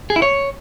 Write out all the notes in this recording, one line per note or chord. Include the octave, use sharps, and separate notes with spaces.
G#4
E4
C#5